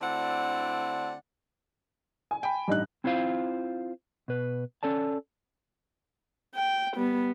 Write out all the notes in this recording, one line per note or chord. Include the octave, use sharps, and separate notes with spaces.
D2 D3 C4 E4 D5 F#5
G#5
G5 B5
A1 G2 D#4 F#6
C4 E4 F4 C5 F5
B2 B4
C#4 A4 D5 A5
G5
G3 B3